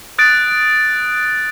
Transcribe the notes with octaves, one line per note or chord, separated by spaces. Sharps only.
D#6 F#6 A6 D7